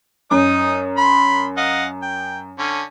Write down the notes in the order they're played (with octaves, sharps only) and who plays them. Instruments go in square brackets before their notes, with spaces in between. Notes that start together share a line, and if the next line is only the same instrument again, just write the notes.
[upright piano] F#2 [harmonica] D#4 D#6
[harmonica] B5 C6
D#5 F5 F#5
G5
D3 C#4